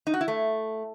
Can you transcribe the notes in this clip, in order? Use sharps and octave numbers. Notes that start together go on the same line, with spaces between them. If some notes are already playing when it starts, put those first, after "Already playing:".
D#4
F#4
E4
A3